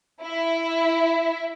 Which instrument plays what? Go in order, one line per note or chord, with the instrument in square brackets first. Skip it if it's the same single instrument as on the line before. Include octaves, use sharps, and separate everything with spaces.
[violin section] E4